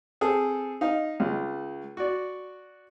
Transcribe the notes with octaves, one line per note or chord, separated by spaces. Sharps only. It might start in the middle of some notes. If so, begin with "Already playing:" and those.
C4 G#4 A4
D#4 F5
C#2
F#4 D5